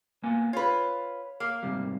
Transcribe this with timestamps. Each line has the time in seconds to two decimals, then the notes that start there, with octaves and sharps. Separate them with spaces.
0.24 A#3 B3 G#5
0.53 F4 B4 C#5
1.40 A#3
1.63 G#2 C3 G3